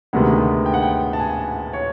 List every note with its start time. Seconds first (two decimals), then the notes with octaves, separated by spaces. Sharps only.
0.13 D2 C3 D#3 G#3 B3 F#5
0.66 G5
0.74 F#5
0.82 G5
1.13 A5
1.20 G#5
1.73 C#5